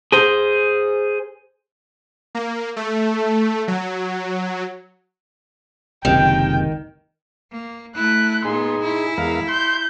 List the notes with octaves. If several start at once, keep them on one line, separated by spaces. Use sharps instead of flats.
G#4 C5
A#3
A3
F#3
F#1 C#2 C3 D#3 G5
A#3
A3 E4 F#6
A#2 B3 D#4 G#4 C6
E4
E2 G#3 A#4 F5
C6 G6